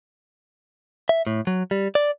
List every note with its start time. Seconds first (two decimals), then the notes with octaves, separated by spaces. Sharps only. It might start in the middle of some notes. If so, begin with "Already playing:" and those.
1.09 E5
1.27 A2
1.47 F#3
1.71 G3
1.95 D5